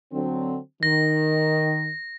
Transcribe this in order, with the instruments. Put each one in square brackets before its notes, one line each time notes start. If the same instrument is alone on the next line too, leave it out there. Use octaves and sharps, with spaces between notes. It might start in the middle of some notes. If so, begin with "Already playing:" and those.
[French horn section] D3 F#3 C4
[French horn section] D#3 [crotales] A#6